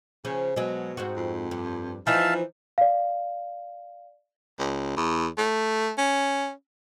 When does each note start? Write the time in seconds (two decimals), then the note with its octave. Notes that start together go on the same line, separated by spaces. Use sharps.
0.25 C#3 F3 C#4
0.56 B2 F#3 G#3
0.97 G#2 C4 F#4
1.16 F2
1.51 G2
2.07 E3 F3 D#4 F4 E5 F5 A5
2.78 D5 F5
4.59 C#2
4.97 E2
5.38 A3
5.98 C#4